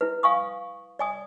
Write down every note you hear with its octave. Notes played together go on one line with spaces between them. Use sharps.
E4 B4
F5 G#5 C#6 D#6
D5 G#5 D#6